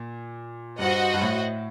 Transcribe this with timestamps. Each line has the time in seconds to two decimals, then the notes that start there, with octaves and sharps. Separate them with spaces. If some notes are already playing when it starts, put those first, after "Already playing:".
Already playing: A#2
0.79 G2 F#4 C5 D#5 F#5
1.14 G2
1.22 A2